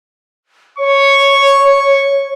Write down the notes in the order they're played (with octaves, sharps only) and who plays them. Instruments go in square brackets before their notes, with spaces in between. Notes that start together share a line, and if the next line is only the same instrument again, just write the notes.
[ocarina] C#5 [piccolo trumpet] C#6